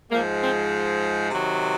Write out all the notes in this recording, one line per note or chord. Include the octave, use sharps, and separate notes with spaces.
G#2 F3 G#3 A#3
C4
C3 D#3 F#3